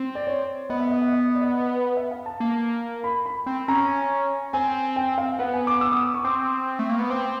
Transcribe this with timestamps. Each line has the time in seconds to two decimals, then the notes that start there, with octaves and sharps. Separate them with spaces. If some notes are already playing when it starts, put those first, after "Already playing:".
Already playing: C4
0.15 D5
0.27 C#5
0.69 B3 D#5
0.80 E5
0.90 D#5
1.01 E5
1.12 D#5
1.27 D#5
1.35 D5
1.41 D#5
1.97 E5
2.11 F5
2.26 A5
2.40 A#3
3.04 B5
3.26 B5
3.46 C4
3.68 C#4 A#5
4.53 C4 G#5
4.96 G5
5.18 F5
5.39 B3 F#5
5.53 G#5
5.67 D6
5.81 E6
5.92 D#6
6.03 D6
6.14 C#6
6.24 C4 D6
6.79 A3
6.89 A#3
6.99 B3
7.10 C4 D6